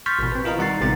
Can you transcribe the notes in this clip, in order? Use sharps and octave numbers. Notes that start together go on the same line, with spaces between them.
C6 C#6 F6 G6 A6 B6
A1 B2
C4 B4
E4 F4 A#4 D#5 F5 A#5
D#3 G3 F#5 A#5 A6 C7
A1 C3 B3 D#4 A6